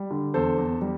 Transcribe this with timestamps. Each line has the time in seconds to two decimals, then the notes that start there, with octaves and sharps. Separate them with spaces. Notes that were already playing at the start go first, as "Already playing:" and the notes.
Already playing: G3
0.11 D3
0.34 E2 A4 C5
0.58 E2
0.82 G3